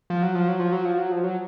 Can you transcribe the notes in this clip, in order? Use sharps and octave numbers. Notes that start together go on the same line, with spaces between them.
F3
F#3
F3
F#3
F3
F#3
F3
F#3
F3
F#3